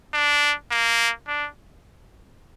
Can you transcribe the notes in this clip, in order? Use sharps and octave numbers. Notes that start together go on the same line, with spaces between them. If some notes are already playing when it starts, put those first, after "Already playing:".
D4
A#3
D4